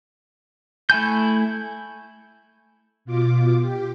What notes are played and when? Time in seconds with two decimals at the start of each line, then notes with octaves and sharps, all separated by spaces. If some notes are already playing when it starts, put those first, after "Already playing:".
0.90 A3 E4 G#5 G6
3.05 B2 F4 D6
3.61 G4